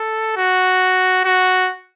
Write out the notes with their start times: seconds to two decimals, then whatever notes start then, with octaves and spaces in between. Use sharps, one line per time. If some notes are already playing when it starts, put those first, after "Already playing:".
Already playing: A4
0.37 F#4
1.25 F#4